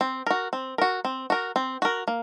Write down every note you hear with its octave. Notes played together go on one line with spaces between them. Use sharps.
C4
F#4 A#4
C4
F#4 A#4
C4
F#4 A#4
C4
F#4 A#4
A#3